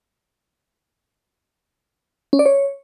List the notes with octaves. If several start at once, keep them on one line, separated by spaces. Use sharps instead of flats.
C#4
D5
C#5